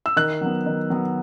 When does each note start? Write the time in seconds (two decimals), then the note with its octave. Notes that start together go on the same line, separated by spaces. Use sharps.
0.06 E6
0.16 D#3 F#6
0.41 F#3 B3
0.66 D#3
0.90 F#3 B3